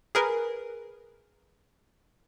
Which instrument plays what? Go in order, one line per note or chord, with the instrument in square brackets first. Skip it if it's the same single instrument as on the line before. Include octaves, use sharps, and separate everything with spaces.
[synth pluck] G#4 A#4 B4